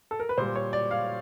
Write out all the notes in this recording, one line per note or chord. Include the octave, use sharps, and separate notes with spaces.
A4
A#4
B4
A#2 G3 C5
C#5
D5
F5